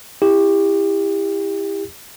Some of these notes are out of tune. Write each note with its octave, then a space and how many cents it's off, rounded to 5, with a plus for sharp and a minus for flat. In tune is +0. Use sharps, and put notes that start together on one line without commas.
E4 +0 G4 +25